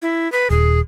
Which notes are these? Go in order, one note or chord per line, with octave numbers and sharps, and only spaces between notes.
E4
B4
D#1 G#4